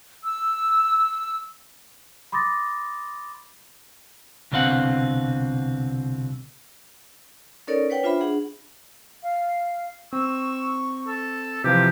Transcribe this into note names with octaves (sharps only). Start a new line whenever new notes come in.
E6
B5 C6 D6 D#6 A6 A#6
C2 B2 D3 C4 F5 F#5
C#4 D#4 A4 A#4 C#5 D5
B4 C#5 F#5 G5
D4 F4 C5 E5 B5
D4 G#4 F#5
F5
C4 C#6 E6
A4
C3 E3 F3 F4 G4